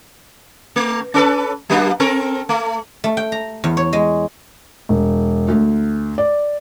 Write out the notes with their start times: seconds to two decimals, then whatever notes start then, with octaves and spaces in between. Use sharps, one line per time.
0.76 A3
1.14 C#4 A4 B4
1.70 F#3 A#3 D4
2.00 C4 A4 A#4
2.49 A3
3.04 A3
3.17 G5
3.32 A#5
3.64 E2
3.77 C#5
3.93 G#3
4.89 E1
5.48 D2
6.18 D5